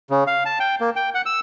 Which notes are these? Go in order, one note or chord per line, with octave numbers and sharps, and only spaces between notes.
C#3
F5
A5
G5
A#3
G5
F#5
E6